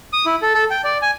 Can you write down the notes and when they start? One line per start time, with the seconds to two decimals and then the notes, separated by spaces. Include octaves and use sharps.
0.13 D#6
0.26 E4
0.42 A4
0.54 A4
0.70 G5
0.84 D5
1.02 G#5